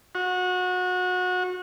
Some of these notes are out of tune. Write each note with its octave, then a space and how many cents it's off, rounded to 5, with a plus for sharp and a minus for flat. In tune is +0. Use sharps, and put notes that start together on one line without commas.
F#4 -25